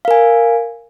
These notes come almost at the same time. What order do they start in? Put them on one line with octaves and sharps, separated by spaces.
F5 A#4 G#5